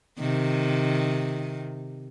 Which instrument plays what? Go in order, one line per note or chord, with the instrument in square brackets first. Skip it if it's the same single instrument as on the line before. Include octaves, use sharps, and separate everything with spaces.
[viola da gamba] C3 D#3